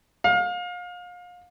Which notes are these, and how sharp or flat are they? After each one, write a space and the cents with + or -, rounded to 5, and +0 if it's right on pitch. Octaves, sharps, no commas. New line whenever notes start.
F5 +30